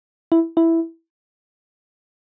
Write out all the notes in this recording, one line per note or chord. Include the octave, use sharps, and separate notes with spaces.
E4
E4